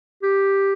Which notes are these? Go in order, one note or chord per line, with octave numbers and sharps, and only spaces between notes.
G4